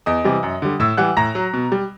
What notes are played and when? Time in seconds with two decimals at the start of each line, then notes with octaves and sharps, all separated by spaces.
0.06 E2 D#5 D#6
0.24 C3 E3 G3
0.43 F#2
0.62 D3 G3
0.80 A2 E5 E6
0.97 E3 G3 F#5 F#6
1.17 A2 A#5 A#6
1.35 F#3
1.54 B2
1.72 G3